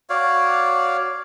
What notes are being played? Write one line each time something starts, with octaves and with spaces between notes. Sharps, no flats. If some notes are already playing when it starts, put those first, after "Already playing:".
F#4 C#5 D5 F5